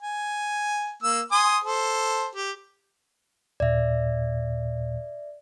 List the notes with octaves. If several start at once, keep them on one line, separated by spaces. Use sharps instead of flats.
G#5
A#3 E6
G#5 C6 D#6
A4 C5
G4
D#2 A#2 D5 E5